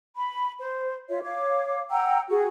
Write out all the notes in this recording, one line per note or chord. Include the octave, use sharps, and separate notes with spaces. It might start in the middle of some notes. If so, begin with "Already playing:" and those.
B5
C5
F4 C#5 E5
C#5 F5 D6
F#5 G5 A#5 E6
F#4 G#4